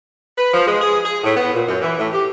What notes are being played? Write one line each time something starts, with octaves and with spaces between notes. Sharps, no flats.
B4
F3
G#3
G#4
G#4
A2
B3
A#2
F#2
E3
A2
G4